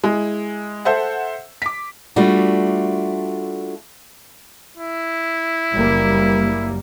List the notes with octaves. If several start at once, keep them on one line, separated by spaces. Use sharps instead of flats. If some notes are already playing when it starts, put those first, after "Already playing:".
G#3 E4
A4 C5 E5 F#5
D6 B6
G3 A3 D4 F4 F#4
E4
F#1 G3 A#3